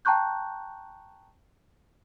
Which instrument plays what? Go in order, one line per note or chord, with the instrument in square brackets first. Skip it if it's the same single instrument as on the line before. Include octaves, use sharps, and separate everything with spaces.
[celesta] G5 A5 A#5 C#6 F#6 G6